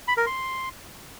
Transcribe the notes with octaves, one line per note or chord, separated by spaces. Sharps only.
B5
A#4
C6